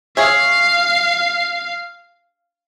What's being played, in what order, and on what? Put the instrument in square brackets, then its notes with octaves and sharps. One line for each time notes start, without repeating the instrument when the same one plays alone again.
[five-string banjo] G#4 C#5 E5 [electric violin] F5